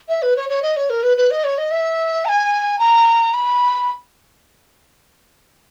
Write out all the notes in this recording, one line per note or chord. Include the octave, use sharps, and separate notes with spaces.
E5
B4
C#5
C#5
D#5
C#5
A#4
B4
B4
D#5
C#5
D#5
E5
A#5
G#5
A#5
B5